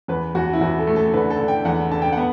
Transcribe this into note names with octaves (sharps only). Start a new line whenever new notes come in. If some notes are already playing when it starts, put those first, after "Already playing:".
E2 B4
E2 F#4
E4
E2 F#4
A4
A3
A4
D3 B4
A4
D3
G5
E2 F#5
D3 A5
G5
F#5
B3